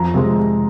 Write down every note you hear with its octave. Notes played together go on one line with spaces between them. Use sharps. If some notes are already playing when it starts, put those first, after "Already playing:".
Already playing: F2 A#5
C3 F3 G#3